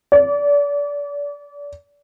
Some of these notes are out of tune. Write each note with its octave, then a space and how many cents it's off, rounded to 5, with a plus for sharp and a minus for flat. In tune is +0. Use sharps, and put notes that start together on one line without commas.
D5 -30